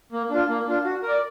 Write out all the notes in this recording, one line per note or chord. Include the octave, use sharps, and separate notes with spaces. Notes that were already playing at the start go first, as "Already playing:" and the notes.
A#3
D4 F4
A#3
D4 F4
F#4
A#4
D5